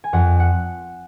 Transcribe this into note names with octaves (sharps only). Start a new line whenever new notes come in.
G#5
F2 F#5
F#5